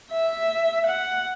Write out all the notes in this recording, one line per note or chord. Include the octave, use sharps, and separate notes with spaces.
E5
F#5